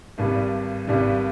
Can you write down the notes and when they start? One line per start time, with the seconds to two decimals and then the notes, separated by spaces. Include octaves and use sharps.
0.18 G#1 G2 G3
0.87 G#1 G2 G3